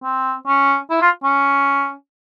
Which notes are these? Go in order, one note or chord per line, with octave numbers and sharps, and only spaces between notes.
C4
C#4
E4
F4
C#4